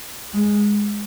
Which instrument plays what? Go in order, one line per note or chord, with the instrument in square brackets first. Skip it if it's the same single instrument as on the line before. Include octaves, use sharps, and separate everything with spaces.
[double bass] G#3